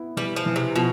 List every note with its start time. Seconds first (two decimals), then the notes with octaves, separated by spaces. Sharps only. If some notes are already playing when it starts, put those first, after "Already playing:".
Already playing: B3 E4
0.17 E3 G3
0.36 F3
0.46 E3
0.56 C3
0.75 B2 F3